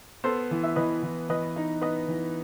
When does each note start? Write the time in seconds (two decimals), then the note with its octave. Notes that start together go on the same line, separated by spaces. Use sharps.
0.24 B3 A4 C5
0.51 E3
0.63 E5
0.76 E3 B4 D#5
1.03 E3
1.29 E3 B4 D#5
1.56 D#4
1.81 B3 B4 D#5
2.08 E3